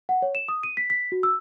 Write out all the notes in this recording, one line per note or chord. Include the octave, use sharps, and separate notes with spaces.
F#5
C#5
E7
D#6
D#7
B6
B6
F#4
E6